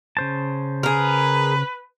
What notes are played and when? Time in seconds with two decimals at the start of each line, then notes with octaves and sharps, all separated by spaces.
0.17 C#3 C5 A5
0.83 G#4 A#4 B4